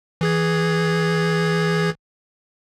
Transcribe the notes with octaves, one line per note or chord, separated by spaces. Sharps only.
E3 G#4 G#6